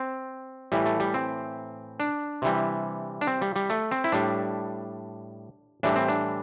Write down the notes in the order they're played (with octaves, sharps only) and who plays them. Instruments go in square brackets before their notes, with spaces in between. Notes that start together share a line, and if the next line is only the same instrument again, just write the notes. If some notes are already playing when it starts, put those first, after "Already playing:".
Already playing: [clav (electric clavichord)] C4
A2 E3 G3
A3
G3
C4
D4
C3 E3 G3
D4
C4
G3
G3
A3
C4
E4
A2 G3 D4
A2 E3 G3 D4
C4
D4